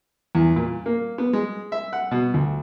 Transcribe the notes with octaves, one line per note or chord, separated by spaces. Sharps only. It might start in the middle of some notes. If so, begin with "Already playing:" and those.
E2
A#2
A#3
B3
G#3
E5
F#5
B2
D2